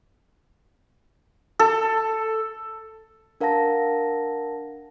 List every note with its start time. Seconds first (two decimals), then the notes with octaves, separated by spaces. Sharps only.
1.59 A4
3.41 D4 A#4 F5 F#5 A5 A#6